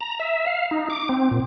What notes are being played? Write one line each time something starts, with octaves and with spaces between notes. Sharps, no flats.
A#5
E5
F5
D#4
D6
C4
A#2